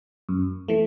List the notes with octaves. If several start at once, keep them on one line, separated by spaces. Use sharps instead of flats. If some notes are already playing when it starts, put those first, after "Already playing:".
F#2
E3 A3